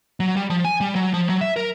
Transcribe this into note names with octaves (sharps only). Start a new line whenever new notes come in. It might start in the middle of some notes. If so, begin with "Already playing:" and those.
F#3
G3
F3
G#5
G3
F#3
F3
F#3
E5
A#4